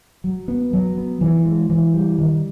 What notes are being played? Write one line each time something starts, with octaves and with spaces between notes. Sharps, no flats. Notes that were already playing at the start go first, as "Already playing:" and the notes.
F#3
B3
F#3
B3
E3
G#3
E3
G3
D#3